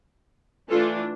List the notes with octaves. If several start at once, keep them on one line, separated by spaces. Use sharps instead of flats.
E3 A3 D4 F4 A4